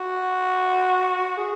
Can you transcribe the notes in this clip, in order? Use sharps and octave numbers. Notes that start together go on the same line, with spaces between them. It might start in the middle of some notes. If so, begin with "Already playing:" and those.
Already playing: F#4
G#4